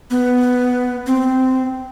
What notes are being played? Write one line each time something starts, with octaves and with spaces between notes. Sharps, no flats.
B3
C4